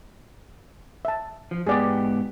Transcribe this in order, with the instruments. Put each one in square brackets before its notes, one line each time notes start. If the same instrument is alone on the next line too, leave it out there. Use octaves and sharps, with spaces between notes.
[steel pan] E5 A5
[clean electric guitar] F3
[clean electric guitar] G#2 B3 G4 [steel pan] G#4 D5